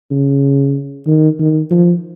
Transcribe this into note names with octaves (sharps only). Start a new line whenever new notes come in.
C#3
D#3
D#3
F3